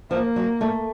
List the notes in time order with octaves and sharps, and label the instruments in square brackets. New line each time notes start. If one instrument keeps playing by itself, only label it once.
[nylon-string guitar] F3 [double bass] A#3
[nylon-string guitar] F#3
A3